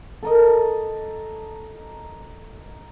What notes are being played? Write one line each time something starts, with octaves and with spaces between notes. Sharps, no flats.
A4 A#4 D#5